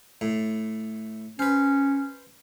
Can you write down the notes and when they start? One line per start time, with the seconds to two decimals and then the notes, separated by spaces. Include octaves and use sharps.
0.21 A2
1.39 C#4 B4 C5